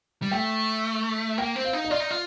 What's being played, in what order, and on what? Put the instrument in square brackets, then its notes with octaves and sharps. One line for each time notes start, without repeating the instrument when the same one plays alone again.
[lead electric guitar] G3
[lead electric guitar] A3 [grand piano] G5
[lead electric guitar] A#3 [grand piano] G5
[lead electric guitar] C4
[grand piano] F5
[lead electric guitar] D#4
[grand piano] D#5
[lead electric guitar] F4 [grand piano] D5
[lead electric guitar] D#4
F4